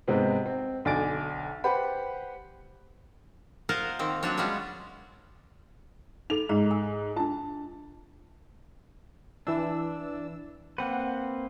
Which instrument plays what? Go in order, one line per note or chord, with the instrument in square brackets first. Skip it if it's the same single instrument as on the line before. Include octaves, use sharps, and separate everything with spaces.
[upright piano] G#2 C3 B3 C4 D#4
C4
B1 D3 D5 G#5 A6 D7
G4 B4 C5 F#5 B5
[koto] F4 A#4 C5 D#5 F5 F#5
D#3 A#3 C4
F#3 C4 D4 F#4 C#5
G3 G#3 B3 C#4 F4 F#4
[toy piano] D#4 A4 [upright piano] F7
[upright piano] G#2 [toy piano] A#5
[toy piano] G#5
[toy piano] D4 F4 [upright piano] A5
[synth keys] E3 E6 [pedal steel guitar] D4
[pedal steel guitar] A#3 C4 B4 [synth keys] F#5